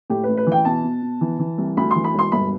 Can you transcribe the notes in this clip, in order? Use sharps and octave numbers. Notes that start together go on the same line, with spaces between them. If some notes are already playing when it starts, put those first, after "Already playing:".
A2 G4
A1 B4
B4
E3
G5
B2 A5
B2
B2
E3
E3
C2
D2 B5
C6
E3
B5
E1
C6
G1 B5